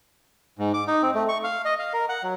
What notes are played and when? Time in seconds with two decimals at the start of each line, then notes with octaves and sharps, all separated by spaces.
0.59 G#2
0.74 D6
0.87 D#4
1.02 C4
1.14 A3
1.29 C#6
1.44 F5
1.65 D#5
1.79 F5
1.93 A#4
2.09 F#5
2.23 F#3